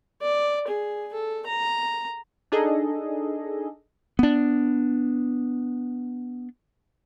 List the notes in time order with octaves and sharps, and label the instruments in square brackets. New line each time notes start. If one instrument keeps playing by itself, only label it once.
[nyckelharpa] D5
G#4
A4
A#5
[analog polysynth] D4 D#4 G#4 A4 D#5
[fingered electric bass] B3 D4